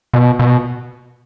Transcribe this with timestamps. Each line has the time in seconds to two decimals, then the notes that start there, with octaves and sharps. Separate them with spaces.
0.14 B2
0.39 B2